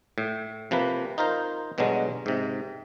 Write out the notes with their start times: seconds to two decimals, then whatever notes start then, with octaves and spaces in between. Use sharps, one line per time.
0.18 A2
0.71 C3 F3 A#3 B4
1.18 D#4 F4 A#4 C5
1.78 G2 B2 D3 F#3 G#3
2.26 G#2 C3